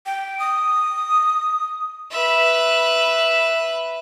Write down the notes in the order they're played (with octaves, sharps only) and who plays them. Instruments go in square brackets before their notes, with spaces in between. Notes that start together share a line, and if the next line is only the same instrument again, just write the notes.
[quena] G5
D#6
[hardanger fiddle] B4 E5